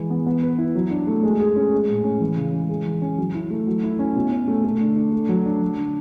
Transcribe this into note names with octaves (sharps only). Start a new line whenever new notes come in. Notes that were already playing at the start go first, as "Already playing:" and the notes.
Already playing: E3 G#3
B3
B3
B4
E4
F#3
D4
A3
G#3
G#4
C#4
G#3
A2
C#4
E3
C#3
G#3
G#3
E3
C#4
F#3
E4
A3
F#3
E4
C#4
B2
C#4
A3
A3
D3
D4
A3
F#3
D4
F#3
D3